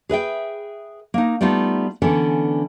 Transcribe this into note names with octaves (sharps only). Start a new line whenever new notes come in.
G#4 B4 E5 G5
A#3 D#4
G3 A3 B3 D#4 F4
D3 E3 B3 C#4 A4